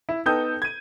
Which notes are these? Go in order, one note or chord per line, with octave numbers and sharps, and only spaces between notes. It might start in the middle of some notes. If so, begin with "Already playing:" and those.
E4
B3 D#4 A4 G5 D#6 G6
G#6 D#7